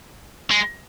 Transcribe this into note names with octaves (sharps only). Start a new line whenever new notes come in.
G#3